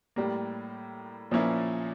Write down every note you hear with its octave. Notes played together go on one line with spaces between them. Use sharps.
A2 G3 A#3
A#2 F3 A#3 C#4 E4